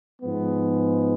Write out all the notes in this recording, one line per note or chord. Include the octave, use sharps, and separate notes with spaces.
G#2 F3 G#3 B3